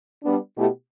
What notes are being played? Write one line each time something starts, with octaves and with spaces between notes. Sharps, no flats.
G3 B3 D4
B2 A3 E4 G4